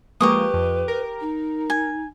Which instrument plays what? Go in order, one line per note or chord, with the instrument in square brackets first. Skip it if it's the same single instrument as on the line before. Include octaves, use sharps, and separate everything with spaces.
[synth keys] F3 G#3 A#3 [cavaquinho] G4 C#6 D#6 [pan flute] B4
[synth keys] F2
A#4
[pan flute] D#4
[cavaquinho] G#5